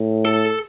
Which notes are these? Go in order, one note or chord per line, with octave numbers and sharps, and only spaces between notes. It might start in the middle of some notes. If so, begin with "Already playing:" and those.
Already playing: A2
A4